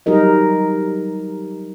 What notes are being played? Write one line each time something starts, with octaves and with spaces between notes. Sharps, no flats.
F#3 G3 D#4 G4 A#4 D#5